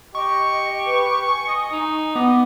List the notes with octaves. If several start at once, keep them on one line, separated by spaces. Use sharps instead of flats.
G4 D#5 C#6
B4
G#5
D#5
D#4
B3 D#5 D6